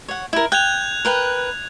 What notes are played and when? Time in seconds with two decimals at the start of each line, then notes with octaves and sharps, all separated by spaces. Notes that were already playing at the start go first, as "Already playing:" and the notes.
0.08 C#5 F#5
0.33 E4 A#4
0.52 G5 F#6 G#6 F7
1.05 A#4 B4 G5